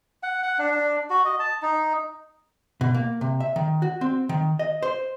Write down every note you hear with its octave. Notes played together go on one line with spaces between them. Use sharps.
F#5
F#5
D4
D4
F#4
D#5
A5
D#4
B2
A#3
C3
E5
D#3
F#4
C4
D#3
D#5
C5